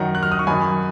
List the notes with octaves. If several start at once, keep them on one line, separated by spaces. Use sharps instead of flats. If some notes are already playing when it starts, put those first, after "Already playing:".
Already playing: F#2 D#3 F#5 A#5
F#6
F6
D#6
C#6
F#2 D#3 G#5 B5